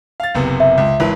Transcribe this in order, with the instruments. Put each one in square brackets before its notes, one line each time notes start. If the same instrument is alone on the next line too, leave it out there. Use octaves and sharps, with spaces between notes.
[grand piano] F5 A6
F#1 C3 B3
[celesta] E5
[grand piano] C#2
G#1 E3 B4